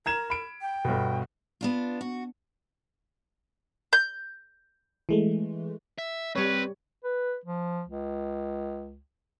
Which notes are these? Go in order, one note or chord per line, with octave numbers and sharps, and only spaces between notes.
A#4 A#5 G#6 E7
B5 D7
G5
G1 B2
B3 D4 F4
F#4
G6
E3 G#3 A3
E5
G3 C4 B4 C#5
B4
F3
C#2